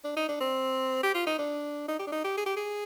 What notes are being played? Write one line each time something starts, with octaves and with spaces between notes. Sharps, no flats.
D4
D#4
D4
C4
G4
F4
D#4
D4
D#4
G4
D4
D#4
G4
G#4
G4
G#4